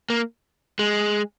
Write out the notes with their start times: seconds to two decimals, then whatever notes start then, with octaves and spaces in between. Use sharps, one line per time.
0.10 A#3
0.79 G#3